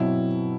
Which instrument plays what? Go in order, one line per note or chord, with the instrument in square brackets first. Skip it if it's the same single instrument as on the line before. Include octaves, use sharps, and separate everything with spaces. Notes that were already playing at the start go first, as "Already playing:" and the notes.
Already playing: [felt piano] B2 F#3 C4 [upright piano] E4